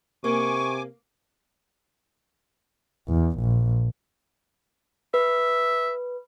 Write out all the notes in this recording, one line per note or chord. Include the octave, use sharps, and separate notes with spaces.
C3 A#3 G#5 C#6 D6
E2
A#1
B4 E5